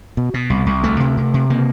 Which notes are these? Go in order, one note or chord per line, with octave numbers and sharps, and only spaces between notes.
B2
B2
C2
C2
D2 A3
C3
C3
C3
C#3 A#3